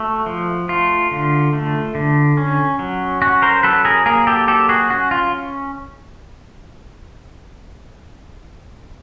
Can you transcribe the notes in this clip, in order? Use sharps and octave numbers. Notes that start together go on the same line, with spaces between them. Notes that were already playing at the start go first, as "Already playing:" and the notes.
Already playing: A3 F#4
F3
A3 F4
D3
A3
D3
C#4
F#3
C#4 F#4
A#4 C5
F#3 A4 B4
G#4 A#4
A#3 G#4 A#4
G4 A4
F#3 G4 A4
F#4 G#4
C#4 F#4
F4